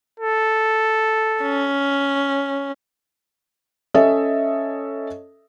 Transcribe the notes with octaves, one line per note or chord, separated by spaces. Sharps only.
A4
C#4
C#4 A4 D#5 E5